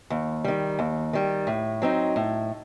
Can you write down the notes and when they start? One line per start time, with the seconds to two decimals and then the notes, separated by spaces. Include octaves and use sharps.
0.10 D#2
0.44 D#3 G3
0.79 D#2
1.13 D#3 G3
1.47 A2
1.82 F#3 C4 D#4
2.16 A2